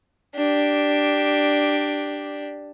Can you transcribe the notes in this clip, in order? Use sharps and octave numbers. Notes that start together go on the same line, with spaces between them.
D4 G4